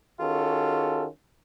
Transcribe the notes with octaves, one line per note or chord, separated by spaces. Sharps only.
D#3 C#4 F4 F#4 G#4 A4